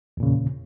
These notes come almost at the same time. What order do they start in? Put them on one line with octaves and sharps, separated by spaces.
E2 A#2 C#3